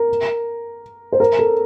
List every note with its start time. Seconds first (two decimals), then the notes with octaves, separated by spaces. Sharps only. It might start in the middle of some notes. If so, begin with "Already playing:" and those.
Already playing: A#4
1.12 C5
1.20 A#4
1.39 A4